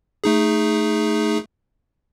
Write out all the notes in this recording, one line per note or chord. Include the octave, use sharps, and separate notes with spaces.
A3 D#4 G#4